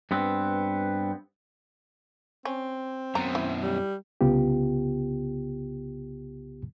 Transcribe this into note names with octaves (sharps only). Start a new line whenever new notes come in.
G2 B3 C4
C4 C#4
F#2 B2 A#5
E4
G3
C2 C#3 B3 F4 G4